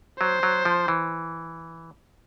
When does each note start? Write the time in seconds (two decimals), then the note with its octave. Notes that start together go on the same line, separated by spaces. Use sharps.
0.20 F#3 C5
0.43 F#3
0.65 F3
0.88 E3